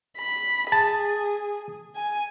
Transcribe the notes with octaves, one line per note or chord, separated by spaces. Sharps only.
B5
G#4 A5
G#5